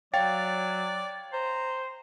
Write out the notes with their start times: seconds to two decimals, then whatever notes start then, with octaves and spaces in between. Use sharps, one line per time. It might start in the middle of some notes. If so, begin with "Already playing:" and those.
0.14 F#3 C#5 D5 F5 G5 A6
1.33 C5 A#5